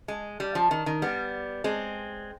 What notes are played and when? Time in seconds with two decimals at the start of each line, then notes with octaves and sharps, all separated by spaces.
0.08 G#3
0.40 G3
0.55 F3
0.71 D#3
0.86 D#3
1.02 G3 B3
1.64 G#3 C4